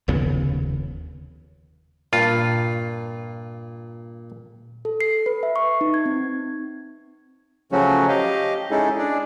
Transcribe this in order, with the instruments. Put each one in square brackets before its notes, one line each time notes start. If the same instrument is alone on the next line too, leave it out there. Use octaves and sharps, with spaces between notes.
[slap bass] F1 D#2 C#3 B3
[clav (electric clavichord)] G2 F4 [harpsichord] A#2
[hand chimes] A4
C7
B4
E5
C#6
D#4
G#6
C4
[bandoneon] C#3 F3 F#3 A3 C#4 F#4
G4 D#5 F5
G#3 C#4 D#4 E4 G#4 A4
D4 G#4 D5